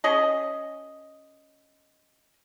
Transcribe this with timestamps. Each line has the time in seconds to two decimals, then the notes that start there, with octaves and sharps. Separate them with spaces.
0.04 C#4 G#4 D#5